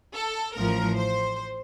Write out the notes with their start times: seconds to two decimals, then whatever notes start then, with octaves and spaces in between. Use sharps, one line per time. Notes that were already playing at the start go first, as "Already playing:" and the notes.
0.14 A4
0.56 A1 A2 F3 A#4
0.97 C5